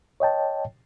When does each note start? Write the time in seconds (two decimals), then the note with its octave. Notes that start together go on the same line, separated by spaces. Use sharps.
0.20 C#5 D#5 G5 A5